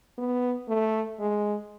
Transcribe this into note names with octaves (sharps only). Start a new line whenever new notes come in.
B3
A3
G#3